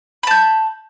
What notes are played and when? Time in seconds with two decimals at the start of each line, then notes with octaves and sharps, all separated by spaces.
0.23 B5
0.27 A5
0.31 G6